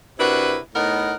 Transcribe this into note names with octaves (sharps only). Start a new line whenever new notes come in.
C3 D4 E4 F#4 A#4 B4
A2 B3 D#4 A#4 F#5